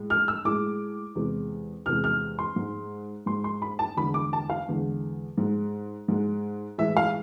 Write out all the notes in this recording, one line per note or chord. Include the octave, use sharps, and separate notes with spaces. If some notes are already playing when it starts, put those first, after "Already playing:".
Already playing: A2 G#3
F6
E6
A2 G#3 D6
E2 C3 G#3
E2 C3 G#3 F6
F6
C6
G#2 G#3
G#2 G#3 C6
C6
B5
A5
E2 D3 G#3 B5
D6
A5
F5
E2 D3 G#3
G#2 G#3
G#2 G#3
A2 E3 G#3 E5
F5